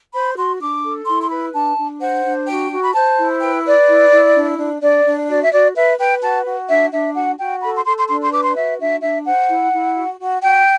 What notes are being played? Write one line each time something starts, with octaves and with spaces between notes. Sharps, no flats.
C5 B5
F#4 C6
D4 D6
A4
E4 C6
C6
B4 B5
D4 A5
D4
C5 F#5
D4
F#4 G5
F#4
B5
C5 A5
E4
B4 G5
B4 D5
E4
E4
D4
D4
D4 D5
D4
F#4 D5
E5
F#4 D5
B4 E5
B4 G5
F#4 A5
F#4
D4 E5
D4 E5
F#4 F#5
F#4 G5
A4 B5
C6
A4 C6
C6
D4 C6
C6
B4 D6
C6
F#4 E5
D4 E5
D4 E5
C5 F#5
E4
E4
F#4
F#4
F#4 G5